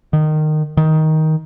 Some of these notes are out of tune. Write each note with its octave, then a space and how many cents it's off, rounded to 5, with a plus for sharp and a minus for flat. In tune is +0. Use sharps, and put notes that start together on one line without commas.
D#3 -20
D#3 +10